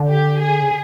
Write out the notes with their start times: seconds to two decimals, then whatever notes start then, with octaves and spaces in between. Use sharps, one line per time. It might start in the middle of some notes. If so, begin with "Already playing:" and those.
Already playing: D3
0.08 G4
0.40 G#4
0.62 C#3